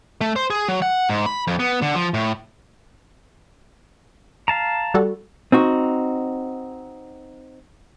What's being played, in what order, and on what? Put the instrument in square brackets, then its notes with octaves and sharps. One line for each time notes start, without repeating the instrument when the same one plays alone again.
[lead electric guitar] A3
C5
G#4
F#3
F#5
G#2
B5
F2
B3
D3
F3
A2
[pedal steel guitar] F5 A5 A#5
[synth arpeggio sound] G3 F#4 A4
[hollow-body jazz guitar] C4 D#4 F#4